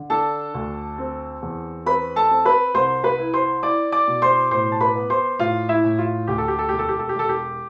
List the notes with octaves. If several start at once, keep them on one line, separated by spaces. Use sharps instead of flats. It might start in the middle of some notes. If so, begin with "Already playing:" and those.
Already playing: D3
D4 A4 A5
D2
C4
E2
C4 B4 B5
A4 A5
C4
B4 B5
C2 C5 C6
B4 B5
E4
C5 C6
E4 D5 D6
D5 D6
B2
C5 C6
A2 C5 C6
A5
B4 B5
B3
C5 C6
A2 F4 F5
E4 E5
A2
F4
D2 G4
A4
G4
A4
E1 G4
A4
G4
A4
G4
E1 A4
G4